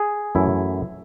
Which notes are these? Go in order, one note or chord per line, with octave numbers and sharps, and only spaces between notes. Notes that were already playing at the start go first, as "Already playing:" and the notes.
Already playing: G#4
F#2 E3 A3 E4